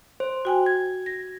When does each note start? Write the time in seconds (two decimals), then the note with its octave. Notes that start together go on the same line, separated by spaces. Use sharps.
0.20 C5
0.45 F#4 G5 G#5
0.66 G#6
1.06 A#6